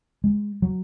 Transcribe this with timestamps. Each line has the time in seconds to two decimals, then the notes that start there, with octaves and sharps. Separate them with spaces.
0.24 G#3
0.62 F#3